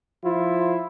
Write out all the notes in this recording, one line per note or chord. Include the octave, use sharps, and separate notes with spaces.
F3 E4 F4